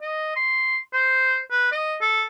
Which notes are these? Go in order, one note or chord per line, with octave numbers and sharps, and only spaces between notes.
D#5
C6
C5
B4
D#5
A4